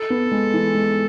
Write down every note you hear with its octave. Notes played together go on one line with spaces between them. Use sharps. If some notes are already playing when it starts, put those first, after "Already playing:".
Already playing: A4
B3
G#3
E3
G#3